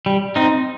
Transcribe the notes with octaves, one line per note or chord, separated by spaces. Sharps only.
G3
C4 D#4